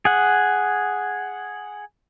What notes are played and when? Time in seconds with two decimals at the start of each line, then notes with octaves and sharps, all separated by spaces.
0.05 G#4 F#5